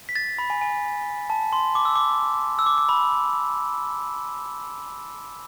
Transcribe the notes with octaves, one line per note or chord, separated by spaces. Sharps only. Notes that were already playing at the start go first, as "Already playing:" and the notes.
B6
A6
B5
G#5
G#5
A5
C6
D6
E6
D6
E6
D6
D6
B5